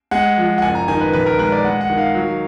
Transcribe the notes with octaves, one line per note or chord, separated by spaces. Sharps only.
G#3 F#5
F3
F#5
F#1 G#5
A#5
D#3 G#5
B4
A#1 B4
A#4
G#3 B4
D5
G#3 F#5
F#5
D#3
F5
F#3